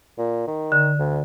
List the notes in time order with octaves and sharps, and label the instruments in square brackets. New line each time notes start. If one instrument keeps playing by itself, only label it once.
[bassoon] A#2
D#3
[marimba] D3
[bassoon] D2